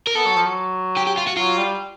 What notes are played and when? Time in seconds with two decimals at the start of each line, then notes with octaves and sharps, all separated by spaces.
0.07 A#4
0.15 B3 A4
0.26 F#3
0.36 F3
0.45 F#3
0.97 G4
1.07 G4
1.17 F4
1.27 F#4
1.37 F#3 F4
1.57 G3